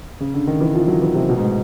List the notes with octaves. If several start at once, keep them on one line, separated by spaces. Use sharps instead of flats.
C#3
D3
D#3
E3
F3
F#3
E3
C3
B2
G#2
A2